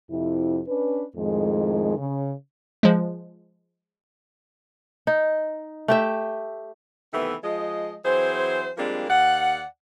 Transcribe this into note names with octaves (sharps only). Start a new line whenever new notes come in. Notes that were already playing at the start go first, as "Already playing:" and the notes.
F2 C3 E4
C#4 D4 B4
F2 A2 D#3 G#3
C#3
F3 G#3
D#4
A3 G4 E5
C3 D#3 E3 A3 B3
F3 G#3 D#5
E3 F#3 C4 G#4 C5
F3 G3 G#3 A#3 C4 D4
D#2 D5 F5 F#5